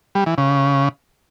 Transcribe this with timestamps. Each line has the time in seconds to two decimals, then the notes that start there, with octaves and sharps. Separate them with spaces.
0.15 G3
0.26 E3
0.38 C#3